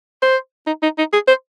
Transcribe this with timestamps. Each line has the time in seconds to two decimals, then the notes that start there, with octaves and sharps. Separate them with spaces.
0.22 C5
0.67 D#4
0.83 D#4
0.98 D#4
1.13 G#4
1.27 C5